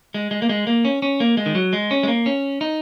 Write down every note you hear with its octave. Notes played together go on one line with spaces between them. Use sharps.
G#3
G#3
A#3
G#3
A#3
C#4
C#4
A#3
G#3
D#3
F#3
G#3
C#4
G#3
A#3
C#4
D#4